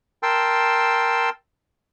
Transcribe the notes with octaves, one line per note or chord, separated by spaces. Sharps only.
A#4 G5 A5 C6 E6